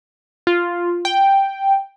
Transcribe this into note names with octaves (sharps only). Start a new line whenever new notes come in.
F4
G5